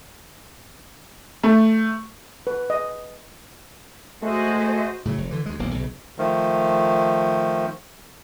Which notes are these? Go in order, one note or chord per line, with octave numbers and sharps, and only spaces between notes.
A3
B4
D#5
G#3 A3 F#4 C5 D#5
A2 C#3 F#3
F1
D3 E3
D2 G#3
D#1 B1 A#3
B1 C#3
D#3 F3 A3